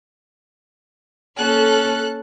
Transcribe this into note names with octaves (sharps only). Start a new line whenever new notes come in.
A#3 C#4 A4 F#6